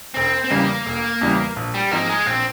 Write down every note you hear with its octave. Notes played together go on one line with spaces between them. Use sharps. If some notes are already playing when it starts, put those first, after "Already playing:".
E1 C4
C4
E2 C#3 G3 A#3
E1
E2 C#3 G3
A#1
G3
G#2 F3 G#3 A#3 C4
G#3
A#1 C4